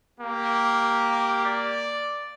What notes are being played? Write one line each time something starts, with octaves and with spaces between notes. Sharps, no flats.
A#3 G4
D5